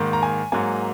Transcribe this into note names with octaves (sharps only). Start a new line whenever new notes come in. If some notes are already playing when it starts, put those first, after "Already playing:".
Already playing: G#2 D#3 A#3
A#5
G#5
G#2 F#3 A#3 G#5